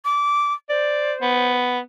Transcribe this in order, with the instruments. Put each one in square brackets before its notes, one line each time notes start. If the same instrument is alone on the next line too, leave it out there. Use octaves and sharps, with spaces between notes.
[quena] D6
[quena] C5 [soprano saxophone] D5
[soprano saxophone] B3